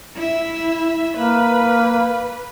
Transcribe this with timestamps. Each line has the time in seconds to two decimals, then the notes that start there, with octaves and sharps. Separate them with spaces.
0.16 E4 E5
1.17 A#3 B4